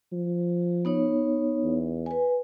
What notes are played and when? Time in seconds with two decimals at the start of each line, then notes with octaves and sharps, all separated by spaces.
0.12 F3
0.85 B3 D#4 C#5
1.63 E2
2.06 B4 G#5